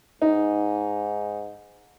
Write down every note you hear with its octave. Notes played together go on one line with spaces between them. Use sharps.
G#2 D#4